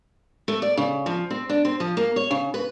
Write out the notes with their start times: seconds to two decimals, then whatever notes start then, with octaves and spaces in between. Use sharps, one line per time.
0.48 A3
0.62 D5
0.77 C#3
1.06 F3
1.30 C4
1.49 D4
1.65 C4
1.80 F3
1.97 A#3
2.16 C#5
2.31 C#3
2.54 B4